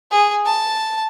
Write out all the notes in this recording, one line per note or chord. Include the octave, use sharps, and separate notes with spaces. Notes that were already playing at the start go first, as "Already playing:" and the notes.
G#4
A5